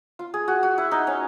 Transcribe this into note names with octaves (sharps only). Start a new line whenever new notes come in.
F4
G#4
F#4
F#4
E4
D#4
C#4